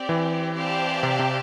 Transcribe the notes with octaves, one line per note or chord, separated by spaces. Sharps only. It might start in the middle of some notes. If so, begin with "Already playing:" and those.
Already playing: C4 G4 D5
E3
C4 G4 D5 F5 A5
C3
C3